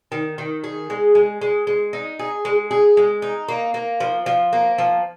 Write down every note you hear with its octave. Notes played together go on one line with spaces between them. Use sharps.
D#3
D#3
G#4
G#3
G#3
G#3
G#3
D#4
G#4
G#3
G#4
G#3
D#4
A#3
A#3
F3
F3
A#3
F3